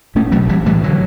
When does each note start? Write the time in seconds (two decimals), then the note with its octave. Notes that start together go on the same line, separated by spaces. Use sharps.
0.15 A2 A3 C#4
0.32 B1 F#3 A3
0.49 B1 E3 G3
0.66 A2 E3 G3
0.83 D3 F#3